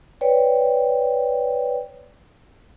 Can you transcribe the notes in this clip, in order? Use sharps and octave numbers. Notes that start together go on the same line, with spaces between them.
B4 C#5 D5 G5